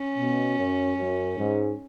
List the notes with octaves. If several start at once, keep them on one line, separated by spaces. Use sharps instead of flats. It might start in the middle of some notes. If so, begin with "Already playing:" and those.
Already playing: C#4
B2
F#2
F#2
G#2